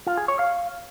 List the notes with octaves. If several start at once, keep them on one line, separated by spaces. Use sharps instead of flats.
F4
G#4
C#5
F5